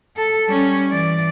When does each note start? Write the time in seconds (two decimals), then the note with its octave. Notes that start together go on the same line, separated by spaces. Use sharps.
0.17 A4
0.48 G3 C#4
0.89 E3 D5